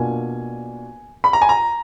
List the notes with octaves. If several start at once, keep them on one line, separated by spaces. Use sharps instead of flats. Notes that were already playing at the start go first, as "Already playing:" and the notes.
Already playing: B2 A#3 D4 F4 G#5
B5
A#5
G#5
A#5